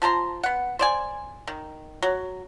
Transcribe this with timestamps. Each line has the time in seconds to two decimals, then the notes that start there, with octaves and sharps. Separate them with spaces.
0.02 F3 A5 A#5 C6
0.43 B3 F#5
0.79 C5 D5 G#5
1.47 D#3
2.02 F#3